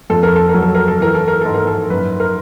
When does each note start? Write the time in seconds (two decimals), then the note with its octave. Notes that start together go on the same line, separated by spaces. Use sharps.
0.10 F2 A4
0.23 A#4
0.36 A4
0.49 A#4
0.54 F#3
0.62 A4
0.75 A#4
0.88 A4
1.00 E3 A#4
1.15 A4
1.28 A#4
1.41 G#2 A4
1.54 A#4
1.67 A4
1.90 F#2 B4
2.20 A#4